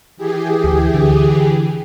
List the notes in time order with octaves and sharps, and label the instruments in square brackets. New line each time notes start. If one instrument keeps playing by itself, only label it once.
[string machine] E3 G4 G#4
[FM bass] D2
D3